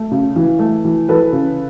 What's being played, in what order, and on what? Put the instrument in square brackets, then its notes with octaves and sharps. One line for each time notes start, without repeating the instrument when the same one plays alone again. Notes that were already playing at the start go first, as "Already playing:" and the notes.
Already playing: [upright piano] A3
C#3
E3
A3
E3
E3 A4 B4
C#3